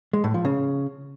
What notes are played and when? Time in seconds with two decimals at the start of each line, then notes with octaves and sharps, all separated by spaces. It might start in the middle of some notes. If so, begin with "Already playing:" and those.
0.13 G#3
0.24 A2
0.34 F3
0.45 C#3